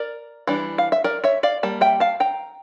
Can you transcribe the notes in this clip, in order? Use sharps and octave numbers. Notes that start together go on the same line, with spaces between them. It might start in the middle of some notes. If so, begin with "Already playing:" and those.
Already playing: A#4 D5
E3 G3 D4
F5
E5
A#4 D5
C#5 E5
D5 F5
G3 A#3 A5
E5 G5
F5 A5
G5 A#5